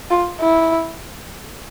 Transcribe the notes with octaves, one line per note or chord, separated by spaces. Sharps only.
F4
E4